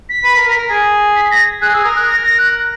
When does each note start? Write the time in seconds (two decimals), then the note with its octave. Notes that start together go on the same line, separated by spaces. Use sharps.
0.09 B6
0.24 B4
0.36 A#4
0.47 A#4
0.58 A#4
0.70 G#4
1.16 B6
1.31 A#6
1.61 G#4 F#6
1.73 G#4 E6
1.84 A#4 D#6
1.96 F#6
2.07 A#6
2.22 A#6
2.38 F#6